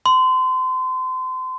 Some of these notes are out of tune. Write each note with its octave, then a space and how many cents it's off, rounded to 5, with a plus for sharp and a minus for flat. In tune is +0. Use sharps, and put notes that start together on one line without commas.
C6 -30